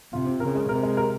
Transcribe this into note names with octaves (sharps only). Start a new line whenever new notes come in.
C3 F4
C4
C#3 A#4
G#3
C3 A#4
G#3
A#4